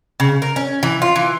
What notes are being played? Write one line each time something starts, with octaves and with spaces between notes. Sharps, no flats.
C#3
A#4
C#4
E3
F4
E3